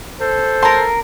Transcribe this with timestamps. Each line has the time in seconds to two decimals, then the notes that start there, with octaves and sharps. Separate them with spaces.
0.21 A4 C5
0.63 A#4 A5 C6